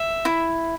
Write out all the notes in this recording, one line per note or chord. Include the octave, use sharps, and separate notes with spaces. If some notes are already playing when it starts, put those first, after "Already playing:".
Already playing: E5
E4